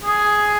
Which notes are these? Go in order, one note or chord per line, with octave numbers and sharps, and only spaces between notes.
G#4